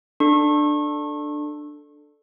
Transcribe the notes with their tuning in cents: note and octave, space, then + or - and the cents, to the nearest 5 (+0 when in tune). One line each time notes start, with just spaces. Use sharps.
D4 +15 A4 +0 C#6 -35